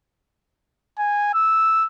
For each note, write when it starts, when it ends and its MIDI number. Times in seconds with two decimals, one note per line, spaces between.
0.98 1.30 80
1.34 1.86 88